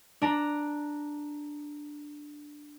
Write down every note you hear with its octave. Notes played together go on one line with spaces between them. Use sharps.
D4 A#5